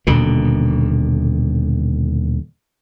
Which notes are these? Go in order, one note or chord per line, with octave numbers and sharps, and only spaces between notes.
D#1 B2 D3